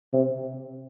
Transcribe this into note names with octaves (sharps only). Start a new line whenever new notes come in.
C3